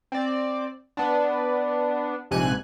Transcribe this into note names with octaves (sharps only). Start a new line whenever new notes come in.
C4 D5
B3 D4
A#1 G#2 C3 G#5 F#6